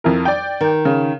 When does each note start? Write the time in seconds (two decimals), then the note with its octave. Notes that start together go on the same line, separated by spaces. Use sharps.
0.04 F2 E4 A#4
0.25 D5 G5
0.61 D#3
0.85 C#3